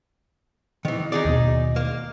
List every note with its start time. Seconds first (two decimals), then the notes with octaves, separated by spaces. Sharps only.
0.85 D#3 E3
1.12 D#4 G#4 D5
1.25 D#2 B2
1.76 A#3